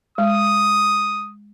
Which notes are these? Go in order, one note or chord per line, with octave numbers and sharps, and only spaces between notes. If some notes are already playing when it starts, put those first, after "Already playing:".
G#3 D#6